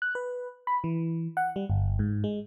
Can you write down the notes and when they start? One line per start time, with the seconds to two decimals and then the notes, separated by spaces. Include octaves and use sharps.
0.02 F#6
0.15 B4
0.67 B5
0.84 E3
1.37 F#5
1.56 G3
1.70 G1
1.99 G#2
2.24 G#3